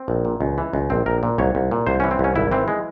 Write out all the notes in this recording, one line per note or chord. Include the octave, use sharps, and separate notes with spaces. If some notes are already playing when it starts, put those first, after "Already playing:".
Already playing: C4
A#1
A#2
C#2
E3
C#2
A#1 C4
A#1 A#4
A#2
C2 C#5
C2
A#2
C2 C5
C#4
E3
C4
C2 C#4
G#1 E4
E3 C4
G#3